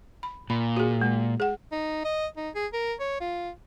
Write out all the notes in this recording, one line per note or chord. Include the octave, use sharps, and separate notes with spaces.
B5
A#2 B5
F#4 G#4
G#3
G#4 F#5
D#4
D#5
D#4
G#4
A#4
C#5
F4